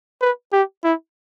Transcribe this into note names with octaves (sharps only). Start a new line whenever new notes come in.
B4
G4
E4